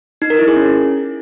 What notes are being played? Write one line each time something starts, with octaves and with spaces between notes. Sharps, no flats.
D#4
A#4
E4
G#4
C#4